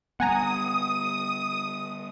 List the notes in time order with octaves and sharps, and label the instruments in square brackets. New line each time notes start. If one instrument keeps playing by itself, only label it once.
[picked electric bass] G3 B3 [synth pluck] F#5 G#5 A#5 [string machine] D#6